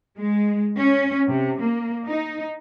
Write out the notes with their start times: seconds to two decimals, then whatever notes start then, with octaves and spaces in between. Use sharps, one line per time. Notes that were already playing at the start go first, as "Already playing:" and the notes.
0.18 G#3
0.78 C#4
1.28 C3
1.61 A#3
2.07 D#4